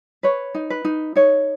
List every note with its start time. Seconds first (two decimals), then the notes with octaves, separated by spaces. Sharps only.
0.23 B4 C#5
0.55 D#4
0.70 B4
0.85 D#4
1.16 D#4 C#5